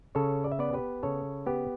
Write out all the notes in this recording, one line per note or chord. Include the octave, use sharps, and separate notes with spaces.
C#3 A4 C#5
D5
E5
B3 B4 D5
G4 B4
C#3 A4 C#5
B3 G4 B4